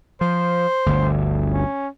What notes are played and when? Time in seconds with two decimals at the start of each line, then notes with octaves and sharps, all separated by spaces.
0.21 F3 C5
0.86 G1 D2
1.52 C#4